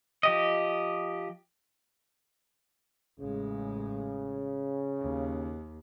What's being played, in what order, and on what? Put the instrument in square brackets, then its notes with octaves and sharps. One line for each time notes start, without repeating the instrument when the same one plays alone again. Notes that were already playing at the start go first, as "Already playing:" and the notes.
[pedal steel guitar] F3 G4 D#5
[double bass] A1 G#3 [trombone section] C#3
[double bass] D#2